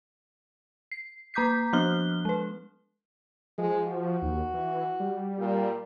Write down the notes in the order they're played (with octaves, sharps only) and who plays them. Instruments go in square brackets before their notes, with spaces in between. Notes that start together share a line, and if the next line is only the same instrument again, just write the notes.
[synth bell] C7
A#3 A#5 D6 G6 B6 C7
F3 B3 D4 F6 F#6 G7
G#3 B4
[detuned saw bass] F3 [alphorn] G#3
[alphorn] F#4
[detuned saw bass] D#2
E3
G3
[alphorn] A#2